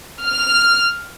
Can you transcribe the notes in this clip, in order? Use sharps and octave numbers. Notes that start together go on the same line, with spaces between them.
F6